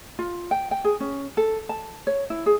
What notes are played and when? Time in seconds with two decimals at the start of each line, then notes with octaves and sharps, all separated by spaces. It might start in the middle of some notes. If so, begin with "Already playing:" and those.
0.19 F4
0.51 G5
0.71 G5
0.84 G#4
1.00 C#4
1.37 A4
1.69 A5
2.07 C#5
2.30 E4
2.46 G#4